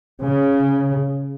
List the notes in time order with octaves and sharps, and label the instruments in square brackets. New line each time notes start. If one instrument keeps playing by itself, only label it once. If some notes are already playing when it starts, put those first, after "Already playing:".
[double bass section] C#3